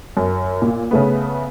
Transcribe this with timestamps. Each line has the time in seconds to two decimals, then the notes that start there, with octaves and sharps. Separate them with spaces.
0.17 F#2
0.62 A#2
0.91 C#3 A3 B3